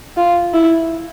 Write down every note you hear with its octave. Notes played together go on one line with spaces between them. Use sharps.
F4
E4